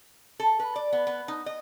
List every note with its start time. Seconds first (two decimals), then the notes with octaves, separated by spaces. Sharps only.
0.40 A4
0.60 B4
0.76 D5
0.93 B3
1.07 B3
1.28 D#4
1.46 D#5